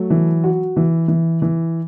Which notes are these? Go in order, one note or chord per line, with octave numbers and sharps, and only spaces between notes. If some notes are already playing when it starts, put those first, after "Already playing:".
Already playing: F#3 A3
E3
F#4
E3
E3
E3